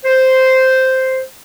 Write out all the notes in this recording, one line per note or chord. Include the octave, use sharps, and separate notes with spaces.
C5